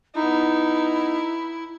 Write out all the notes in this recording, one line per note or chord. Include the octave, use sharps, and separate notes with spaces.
B3 D#4 E4